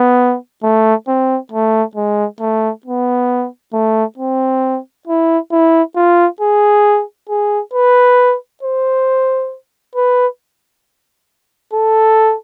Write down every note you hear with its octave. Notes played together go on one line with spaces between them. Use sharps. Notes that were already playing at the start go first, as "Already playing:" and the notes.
Already playing: B3
A3
C4
A3
G#3
A3
B3
A3
C4
E4
E4
F4
G#4
G#4
B4
C5
B4
A4